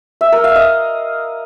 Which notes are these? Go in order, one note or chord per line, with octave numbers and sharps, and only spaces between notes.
E5
A#4
F5
D#5